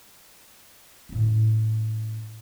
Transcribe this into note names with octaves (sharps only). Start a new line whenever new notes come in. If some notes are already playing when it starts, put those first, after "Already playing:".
A2 C#4